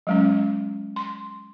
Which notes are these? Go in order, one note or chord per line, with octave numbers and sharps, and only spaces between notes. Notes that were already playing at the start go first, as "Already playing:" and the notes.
F#3 G#3 C#4
C6